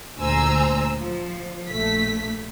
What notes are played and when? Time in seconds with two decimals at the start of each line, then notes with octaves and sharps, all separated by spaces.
0.18 D2 A#2 C5 G#5 A#5 E6
0.98 F3
1.69 A#1 A3 B6